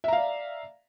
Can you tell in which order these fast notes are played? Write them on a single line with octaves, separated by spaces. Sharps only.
E5 A#5 F5 D5